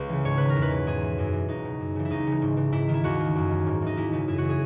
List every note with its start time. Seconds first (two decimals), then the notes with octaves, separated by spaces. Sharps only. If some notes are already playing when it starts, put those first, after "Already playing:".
Already playing: C#2 B4
0.09 C#3 E3
0.25 G#2 C#5
0.38 D#3 B4
0.49 A#4
0.56 E2
0.62 B4
0.71 B2
0.87 G#2 G#4
1.02 E3
1.18 F#2
1.33 E3
1.48 C#2 D#4
1.64 B2
1.80 F#2
1.95 C#3 E3
2.05 E4
2.10 C#2 D#4
2.27 C#3 E3
2.42 G#2
2.57 E3
2.72 G#2 E4
2.88 D#3
2.94 E4
3.04 D#2 F#4
3.20 D#3
3.35 F#2
3.50 D#3
3.66 G#2
3.82 E3 D#4
3.96 D#2 E4
4.13 C#3 E3 D#4
4.28 F#2 E4
4.33 F#4 G#4
4.44 E3
4.49 G#4